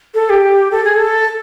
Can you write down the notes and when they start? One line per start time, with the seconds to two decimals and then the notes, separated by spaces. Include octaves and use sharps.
0.15 A4
0.30 G4
0.71 A4
0.85 G#4
0.96 A4